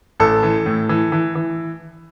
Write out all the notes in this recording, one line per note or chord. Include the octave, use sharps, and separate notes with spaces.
A1 A4
E3
A2
E3
E3
E3